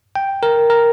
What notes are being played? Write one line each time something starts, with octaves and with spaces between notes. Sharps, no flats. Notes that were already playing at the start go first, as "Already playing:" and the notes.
G5
A#4
A#4